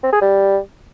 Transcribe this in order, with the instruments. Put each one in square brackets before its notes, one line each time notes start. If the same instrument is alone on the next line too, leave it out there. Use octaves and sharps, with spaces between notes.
[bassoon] C4
G#4
G3